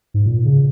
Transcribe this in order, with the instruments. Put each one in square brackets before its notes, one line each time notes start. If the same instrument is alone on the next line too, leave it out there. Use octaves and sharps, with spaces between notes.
[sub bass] G#2
A#2
C#3